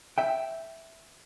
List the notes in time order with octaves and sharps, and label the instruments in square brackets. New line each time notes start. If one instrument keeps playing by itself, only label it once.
[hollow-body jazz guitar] E5 G5